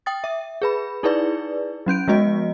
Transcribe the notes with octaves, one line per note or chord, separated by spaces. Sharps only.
G5 D#6 A6
E5
G#4 B4 B5
D#4 E4 G#4 B4 D5
F#3 C#4 G6 D7
F3 G#3 B3 F#4 D#5